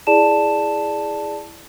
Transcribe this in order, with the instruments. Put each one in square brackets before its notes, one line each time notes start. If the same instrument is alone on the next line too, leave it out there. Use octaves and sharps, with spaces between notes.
[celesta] E4 G#4 D5 A5 E7